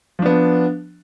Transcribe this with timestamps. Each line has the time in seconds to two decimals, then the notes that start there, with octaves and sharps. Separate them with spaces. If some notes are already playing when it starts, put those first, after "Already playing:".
0.19 F3
0.22 D4
0.26 B3